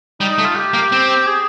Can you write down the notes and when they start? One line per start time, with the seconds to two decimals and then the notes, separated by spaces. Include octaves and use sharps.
0.21 G3 D#4
0.32 D#4
0.38 A3
0.44 F4
0.56 G4
0.74 A#3
0.92 C4
1.26 G#4